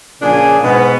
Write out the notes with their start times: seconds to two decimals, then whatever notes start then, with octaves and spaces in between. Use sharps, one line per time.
0.21 A#2 C#3 F3 D4 G#4 G#5
0.62 G#2 B2 B3